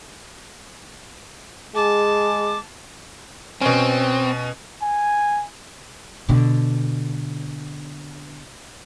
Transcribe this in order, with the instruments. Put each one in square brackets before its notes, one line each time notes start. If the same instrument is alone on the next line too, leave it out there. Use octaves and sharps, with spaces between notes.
[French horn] G#3 [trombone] G#4 [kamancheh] A5 [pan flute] D6
[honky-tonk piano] B2 C#4 [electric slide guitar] C4
[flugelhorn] G#5
[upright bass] B2 D3